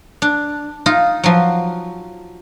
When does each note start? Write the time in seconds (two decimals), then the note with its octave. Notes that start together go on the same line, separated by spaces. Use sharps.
0.22 D4
0.86 D#4 F4
1.24 F3 F#3